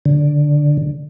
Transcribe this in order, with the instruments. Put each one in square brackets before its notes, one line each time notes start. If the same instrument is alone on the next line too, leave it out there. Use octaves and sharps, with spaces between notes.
[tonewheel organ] D3